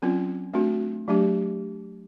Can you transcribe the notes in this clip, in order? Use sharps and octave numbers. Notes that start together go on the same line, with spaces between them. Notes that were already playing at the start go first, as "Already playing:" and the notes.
F#3 C4 C#4 F4
A3 C4 D4 F#4
F#3 A3 D4 G4